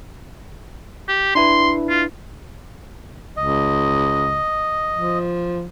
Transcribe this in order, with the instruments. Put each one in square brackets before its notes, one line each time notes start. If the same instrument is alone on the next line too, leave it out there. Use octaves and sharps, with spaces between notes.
[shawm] G4
[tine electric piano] D4 E4 B4 [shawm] C6
[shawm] F4
[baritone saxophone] C#2 [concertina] D#5
[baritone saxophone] F3